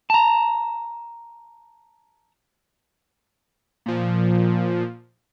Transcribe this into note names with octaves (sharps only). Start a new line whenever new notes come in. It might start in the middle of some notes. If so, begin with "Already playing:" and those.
A5 A#5
A#2 F3